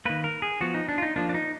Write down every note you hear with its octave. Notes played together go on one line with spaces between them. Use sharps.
D#3 A#3 B4
A#4
G#4
F3 B3 F#4
D#4
D4
F4
D#4
F3 A#3 D4
D4
D#4